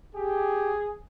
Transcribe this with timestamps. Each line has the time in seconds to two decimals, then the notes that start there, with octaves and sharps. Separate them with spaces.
0.15 G4 G#4